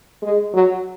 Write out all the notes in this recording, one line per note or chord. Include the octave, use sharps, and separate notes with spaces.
G#3
F#3